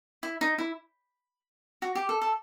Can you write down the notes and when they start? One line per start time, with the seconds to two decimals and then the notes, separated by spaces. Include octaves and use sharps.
0.23 E4
0.41 D#4
0.58 E4
1.82 F#4
1.95 G4
2.09 A4
2.22 A4